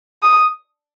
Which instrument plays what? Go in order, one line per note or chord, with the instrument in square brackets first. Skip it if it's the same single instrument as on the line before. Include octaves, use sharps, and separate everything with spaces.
[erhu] D#6